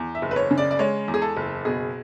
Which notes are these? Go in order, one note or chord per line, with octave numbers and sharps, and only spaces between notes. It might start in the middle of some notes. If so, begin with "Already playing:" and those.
Already playing: E2
E5
F#1
B4
C#5
C#3
D5
D5
G#3 C#5
E2
G#4
A4
F#1
B2 G#4